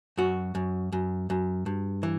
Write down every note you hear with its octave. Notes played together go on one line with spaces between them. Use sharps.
F#2 F#4
F#2
F#2
F#2
G2
E3